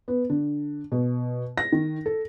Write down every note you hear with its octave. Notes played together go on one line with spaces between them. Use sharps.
B3
D3
B2
A#6
D#3
A4